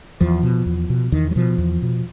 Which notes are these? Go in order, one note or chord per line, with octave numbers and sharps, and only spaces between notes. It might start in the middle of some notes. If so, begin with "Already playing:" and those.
E2 F3
B2
E2
B2
E2 D#3
F#3
B2 F3
E2
B2